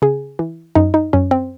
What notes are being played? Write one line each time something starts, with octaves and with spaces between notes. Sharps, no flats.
C#3 G#4
E3
F#2 D#4
D#4
F#2 C#4
C4